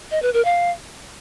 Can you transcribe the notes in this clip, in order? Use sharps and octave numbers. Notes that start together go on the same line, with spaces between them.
D#5
B4
A#4
F5